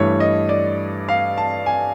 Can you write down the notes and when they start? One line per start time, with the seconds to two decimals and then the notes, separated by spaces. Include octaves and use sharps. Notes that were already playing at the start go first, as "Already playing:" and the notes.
Already playing: G2 E3 A3 C#5
0.20 D#5
0.49 D5
1.09 F5
1.38 A5
1.66 G#5